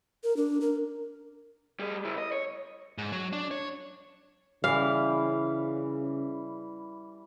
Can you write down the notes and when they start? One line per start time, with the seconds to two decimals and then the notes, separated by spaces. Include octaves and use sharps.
0.24 A#4
0.37 D4
0.61 A#4
1.80 G3 G#4
2.05 C#3 E4
2.18 D#5
2.32 C#5
2.98 G#2
3.12 F#3
3.33 D4
3.51 C#5
4.64 C#3 E3 G3 F5